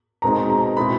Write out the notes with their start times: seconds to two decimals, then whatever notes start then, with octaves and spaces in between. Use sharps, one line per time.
0.22 B2 G#3 C4 D#4 A#5
0.50 A#5
0.77 B2 G#3 C4 E4 B5